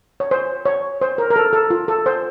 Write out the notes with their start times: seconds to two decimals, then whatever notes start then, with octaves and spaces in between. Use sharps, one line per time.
0.20 C#5
0.31 C5
0.65 C#5
1.01 C5
1.18 A#4
1.30 A#4
1.36 A4
1.53 A4
1.70 F4
1.88 A4
2.06 C5